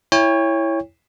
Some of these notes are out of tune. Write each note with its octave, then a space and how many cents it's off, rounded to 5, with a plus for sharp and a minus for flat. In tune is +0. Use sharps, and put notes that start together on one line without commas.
E4 +0 C#5 +0 G5 +40